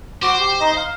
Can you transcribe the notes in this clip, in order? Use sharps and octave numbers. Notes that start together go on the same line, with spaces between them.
F#4 C5 D6
G4
D#4 D#5
F5